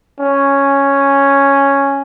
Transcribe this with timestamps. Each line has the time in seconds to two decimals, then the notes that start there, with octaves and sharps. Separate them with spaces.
0.20 C#4